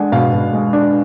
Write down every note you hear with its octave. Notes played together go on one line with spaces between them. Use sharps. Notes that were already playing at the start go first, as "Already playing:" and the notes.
Already playing: G#3 D4 F#5 G#5
B2 F5
B2
G#3
D4